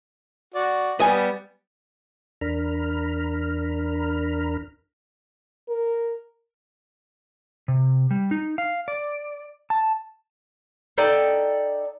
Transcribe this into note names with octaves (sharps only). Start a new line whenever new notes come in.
F#4 D5
G3 B3 D#5 G#5
E2 D4 A#4 A#5 B5 F6
A#4
C3
G3
D#4
F5
D5
A5
D#4 A4 D5 G5